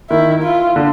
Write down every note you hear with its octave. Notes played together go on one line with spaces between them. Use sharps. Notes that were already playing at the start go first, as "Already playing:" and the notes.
D#3 E4
F4
D3